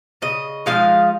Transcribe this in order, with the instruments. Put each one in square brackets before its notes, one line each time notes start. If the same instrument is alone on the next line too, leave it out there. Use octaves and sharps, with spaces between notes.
[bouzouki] C#3 D#5
F3 G#3 D#4 F5